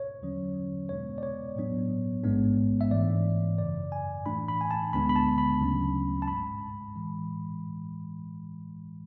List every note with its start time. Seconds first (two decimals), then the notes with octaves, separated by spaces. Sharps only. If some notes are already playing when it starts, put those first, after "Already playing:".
Already playing: C#5
0.22 E2 D3 F#3 C#4
0.89 E2 B2 G#3 B3 D4 C#5
1.18 D5
1.23 C#5
1.56 A2 F#3 B3 D4
2.24 A1 G#2 G#3 B3 D4
2.81 E5
2.91 G#2 E3 A3 D5
3.58 G#1 F#2 C#3 D5
3.92 G#5
4.26 A2 E3 A3 D4 B5
4.48 B5
4.61 G#5
4.71 A5
4.93 D2 D3 G#3 B3 D4 B5
5.09 B5
5.16 A5
5.38 B5
5.60 D2 C#3 F#3 A3 C#4
6.22 A5
6.28 G#1 G#2 G#3 B5
6.95 A2 E3 G#3